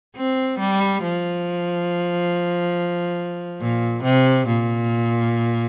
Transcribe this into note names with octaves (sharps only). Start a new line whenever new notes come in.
C4
G3
F3
A#2
C3
A#2